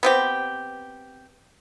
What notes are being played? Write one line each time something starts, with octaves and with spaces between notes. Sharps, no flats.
B3 C4 G4